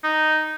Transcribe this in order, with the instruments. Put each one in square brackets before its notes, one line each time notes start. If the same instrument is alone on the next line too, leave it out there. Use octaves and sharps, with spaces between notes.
[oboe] D#4